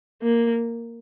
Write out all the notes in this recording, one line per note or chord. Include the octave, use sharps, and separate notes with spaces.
A#3